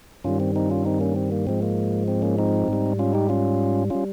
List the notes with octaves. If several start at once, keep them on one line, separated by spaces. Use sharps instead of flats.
G2 D#3 G3 C#4 F4
C4
C4 D#4
C#4 F4
C4 D#4
A#3 C#4
C4
A#3
G#2 F3 G#3 C4
A#3
C4
A#3 C#4
C4 D#4
G#2 G3
C#4 F4
D#4 G4
C#4 F4
G3 C#4 F4